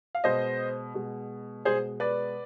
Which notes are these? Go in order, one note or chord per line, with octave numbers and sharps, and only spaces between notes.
F5
B2 G#3 C5 D#5
B2 G#3
B2 G#3 G#4 C5
B4 D5